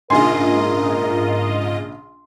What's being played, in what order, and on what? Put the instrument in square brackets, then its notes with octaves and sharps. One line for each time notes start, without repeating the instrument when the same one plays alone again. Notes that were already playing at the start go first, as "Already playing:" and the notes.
[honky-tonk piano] A#1 C#3 G#5 [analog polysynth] G#2 F4 D#5 [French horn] A#4 [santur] C6